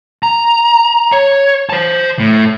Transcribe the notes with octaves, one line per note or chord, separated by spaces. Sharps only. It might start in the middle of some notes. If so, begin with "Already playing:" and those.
A#5
C#5
C5 A5
A2